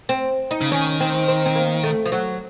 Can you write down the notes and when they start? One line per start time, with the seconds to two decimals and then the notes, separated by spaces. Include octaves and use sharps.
0.09 C4
0.51 D#4
0.61 C#3
0.72 D#3 C#4
1.00 C4
1.28 C4
1.46 C4
1.55 A#3
1.84 A3
2.06 F3
2.12 F#3